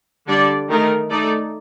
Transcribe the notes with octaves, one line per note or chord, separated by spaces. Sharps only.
D3 G3 D4 A4 D5
D#3 A3 D#4 A#4
A3 D#4 A4 D5